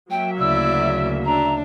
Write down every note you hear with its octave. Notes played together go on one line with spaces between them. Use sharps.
F#3 A#3 E5 G5
D2 C#3 E4 D5 E6
D4 A#5